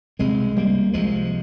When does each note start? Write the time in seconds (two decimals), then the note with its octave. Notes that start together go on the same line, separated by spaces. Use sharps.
0.19 C2 C3 G#3 C4
0.57 G3 A#3
0.93 C2 C3 F3 G#3